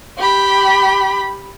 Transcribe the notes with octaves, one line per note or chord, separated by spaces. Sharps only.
G4 B5